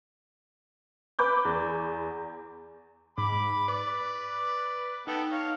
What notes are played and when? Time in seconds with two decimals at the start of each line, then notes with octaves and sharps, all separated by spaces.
1.19 B4 B5 D6 G6
1.45 E2
3.18 G#2 B5 D6
3.68 B4 D5
5.07 B3 D#4 A4 G5
5.31 C#5 F5